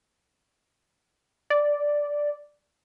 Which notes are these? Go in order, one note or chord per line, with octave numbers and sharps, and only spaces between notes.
D5